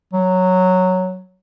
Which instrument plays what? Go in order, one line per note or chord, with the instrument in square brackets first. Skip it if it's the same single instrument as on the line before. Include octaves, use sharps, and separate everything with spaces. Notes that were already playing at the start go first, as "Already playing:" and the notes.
[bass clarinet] F#3